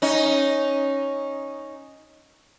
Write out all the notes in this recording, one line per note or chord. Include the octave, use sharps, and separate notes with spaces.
C#4 D#4